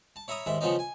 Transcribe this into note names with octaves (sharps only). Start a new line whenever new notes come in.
A5
C#5 E5 A#5 B5 D#6
D#2 G#2 E5
C#3 F3 B3 C#4 D#4
G#5